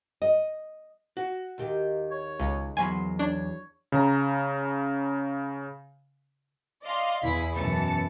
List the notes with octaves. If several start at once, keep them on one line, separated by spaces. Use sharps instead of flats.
D#5
F#4
D#2 D#3 G4
C#5
C#2
E2 F#3 G#5 B5 C6
D4 C#5
C#3 A#5
D5 D#5 F5 C6
E2 E4 G#4 B6
F#2 B2 E3 A5 C#7